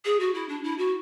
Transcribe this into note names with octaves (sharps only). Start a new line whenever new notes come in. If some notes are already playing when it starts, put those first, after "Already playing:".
G#4
F#4
E4
D4
E4
F#4